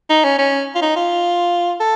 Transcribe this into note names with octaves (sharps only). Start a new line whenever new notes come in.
D#4
C#4
C#4
F4
D#4
F4
A4